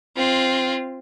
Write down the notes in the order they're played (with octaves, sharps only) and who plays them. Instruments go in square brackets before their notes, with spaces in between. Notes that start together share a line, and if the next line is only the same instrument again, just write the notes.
[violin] C4 F4